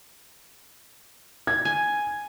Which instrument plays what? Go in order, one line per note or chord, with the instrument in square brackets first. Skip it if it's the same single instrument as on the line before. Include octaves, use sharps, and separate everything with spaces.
[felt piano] G#6
[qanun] G#5